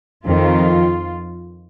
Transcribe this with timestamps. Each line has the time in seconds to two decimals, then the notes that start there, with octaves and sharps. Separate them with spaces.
0.25 F2 D#3 F4